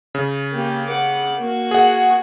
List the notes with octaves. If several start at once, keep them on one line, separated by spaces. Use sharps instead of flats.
C#3
A#3 G4
F#5 D6
A#3 F#4
G#4 F#5